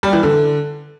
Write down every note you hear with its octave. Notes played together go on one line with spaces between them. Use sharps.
G3
E3
D3